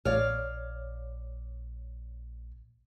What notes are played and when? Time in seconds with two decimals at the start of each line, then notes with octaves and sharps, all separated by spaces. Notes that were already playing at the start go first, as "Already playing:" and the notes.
0.05 A#1 C#5 D5 F5